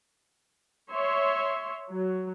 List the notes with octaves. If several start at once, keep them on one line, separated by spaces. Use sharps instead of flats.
C#5 E5 C6
F#3